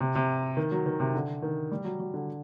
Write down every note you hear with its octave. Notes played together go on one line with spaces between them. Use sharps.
C3
C3
D#3
F#3
D#3
C3
D3
D#3
G3
F#3
F#3
D3